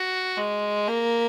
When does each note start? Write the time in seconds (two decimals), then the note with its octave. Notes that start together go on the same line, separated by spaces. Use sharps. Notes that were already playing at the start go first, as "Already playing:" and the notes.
Already playing: F#4
0.37 G#3
0.88 A#3